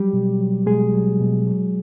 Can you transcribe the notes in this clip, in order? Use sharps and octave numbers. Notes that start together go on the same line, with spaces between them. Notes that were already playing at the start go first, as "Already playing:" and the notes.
Already playing: F#3 G3 G4
B2
F#3
B2 G#3 G#4
F#3
B2
F#3